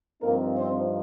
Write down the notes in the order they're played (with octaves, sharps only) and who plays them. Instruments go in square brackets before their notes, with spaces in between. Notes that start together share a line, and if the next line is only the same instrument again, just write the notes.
[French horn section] G2 F3 A#3 C4 D#4 A#4
C4 C5